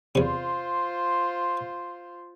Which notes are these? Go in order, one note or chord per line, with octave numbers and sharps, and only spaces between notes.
E2 C3 F4 C5